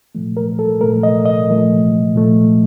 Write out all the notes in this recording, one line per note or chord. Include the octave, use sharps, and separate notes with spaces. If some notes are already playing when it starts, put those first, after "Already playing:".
A#2 F3 A3
A#4
A4
A#2 F3 A3 A#4
D#5
D#5
A#2 F3 A3
A#2 F3 A3